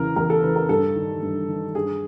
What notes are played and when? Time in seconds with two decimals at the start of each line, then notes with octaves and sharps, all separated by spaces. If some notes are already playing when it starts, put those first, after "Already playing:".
Already playing: E2 C#3 E3 A#4
0.16 E2 A#4
0.30 A4
0.43 C#3 E3 B4
0.56 A#4
0.69 G2 A4
0.96 D#3
1.22 G2
1.48 D#3
1.75 G2 G#4